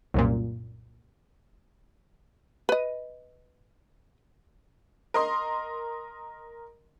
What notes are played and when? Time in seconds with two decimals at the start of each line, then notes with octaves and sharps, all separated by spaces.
0.14 C2 F#2 A#2
2.69 B4 D#5
5.14 A#4 D#5 C6